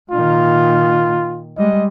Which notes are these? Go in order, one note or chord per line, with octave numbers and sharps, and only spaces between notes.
A#2 D#3 F4
G3 G#3 D#5